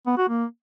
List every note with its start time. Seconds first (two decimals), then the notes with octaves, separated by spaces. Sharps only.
0.06 B3
0.18 F#4
0.29 A#3